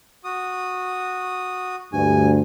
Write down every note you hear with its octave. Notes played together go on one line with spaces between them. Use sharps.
F#4 D#6
D2 G2 G#5